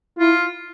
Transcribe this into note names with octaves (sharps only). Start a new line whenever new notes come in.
E4 F4